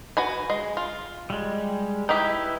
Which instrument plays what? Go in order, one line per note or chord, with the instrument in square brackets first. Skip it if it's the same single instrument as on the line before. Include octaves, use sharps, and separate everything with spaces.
[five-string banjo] F#4 B4 G#5
G#3
F4
[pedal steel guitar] G3 G#3
[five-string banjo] D#4 G4 [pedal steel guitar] E4 B4 G5